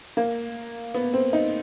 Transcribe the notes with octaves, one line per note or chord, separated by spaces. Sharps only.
A#3
B3
C4
D#4